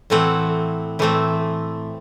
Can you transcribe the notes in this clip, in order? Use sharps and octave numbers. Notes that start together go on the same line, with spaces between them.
A2 E3 A3 C4 F#5
A2 E3 A3 C4